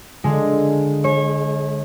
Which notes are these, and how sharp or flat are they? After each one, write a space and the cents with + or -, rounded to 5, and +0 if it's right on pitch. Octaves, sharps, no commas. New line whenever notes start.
D3 +0 G#3 +0 F4 +0
G#3 +35 C#5 -30